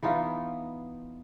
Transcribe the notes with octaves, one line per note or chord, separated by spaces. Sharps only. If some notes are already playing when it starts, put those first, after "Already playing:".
E3 B3 D#4 F4